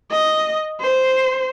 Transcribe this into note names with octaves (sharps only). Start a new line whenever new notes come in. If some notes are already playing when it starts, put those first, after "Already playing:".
D#5
C5